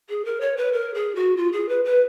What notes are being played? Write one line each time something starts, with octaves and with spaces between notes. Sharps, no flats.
G#4
A#4
C#5
B4
A#4
G#4
F#4
F4
G#4
B4
B4